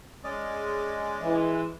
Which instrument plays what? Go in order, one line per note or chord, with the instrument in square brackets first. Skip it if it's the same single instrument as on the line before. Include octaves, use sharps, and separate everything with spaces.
[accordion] G#3 [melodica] C#4 D5 D#5
[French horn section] E3